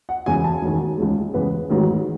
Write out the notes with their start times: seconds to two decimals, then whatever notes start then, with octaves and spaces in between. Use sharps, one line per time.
0.09 F#5
0.26 E1 E2 C#3 G#3 G#5
0.44 A5
0.62 E1 E2 D#3
0.97 C#2 C#3 G#3
1.34 E2 C#3 G#3 B4
1.69 A1 G#2 D#3 F#3